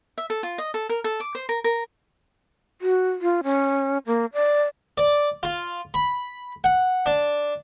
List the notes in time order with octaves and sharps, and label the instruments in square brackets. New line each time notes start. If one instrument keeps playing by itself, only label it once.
[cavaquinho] E5
A4
F4
D#5
A4
A#4
A4
D6
C5
A#4
A#4
[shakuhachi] F#4
F4
C#4
A#3
D5
[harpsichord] D5
F4
B5
F#5
D4